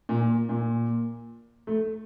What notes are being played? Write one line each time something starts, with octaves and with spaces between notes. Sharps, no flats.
A#2
A#2
A3